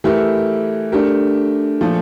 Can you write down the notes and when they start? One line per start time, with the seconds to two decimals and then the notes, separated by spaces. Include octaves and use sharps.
0.04 E3 A3 E4 G4 A#4
0.92 A3 D4 G4 A#4
1.81 A#2 F3 A3